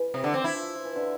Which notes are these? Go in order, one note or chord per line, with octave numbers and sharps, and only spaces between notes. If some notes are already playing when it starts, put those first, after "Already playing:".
Already playing: E3
C3
D3
C4
E4
F3
F3
E3
D3